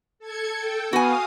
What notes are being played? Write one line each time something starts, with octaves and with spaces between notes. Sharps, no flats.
A4 G#6 C#7
A4 G5
B3 F#4 F5 G#5 D#6